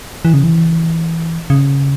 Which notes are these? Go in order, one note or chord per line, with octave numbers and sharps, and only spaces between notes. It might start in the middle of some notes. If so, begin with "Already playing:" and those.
E3
C#3
E3
C#3